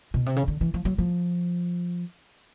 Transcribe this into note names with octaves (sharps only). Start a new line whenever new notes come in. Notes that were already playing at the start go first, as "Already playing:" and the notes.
B2
C3
C#3
D3
E3
F3
F#3
F3